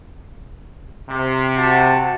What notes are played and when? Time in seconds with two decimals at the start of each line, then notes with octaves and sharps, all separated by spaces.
1.10 C3
1.57 F#4 F#5 A5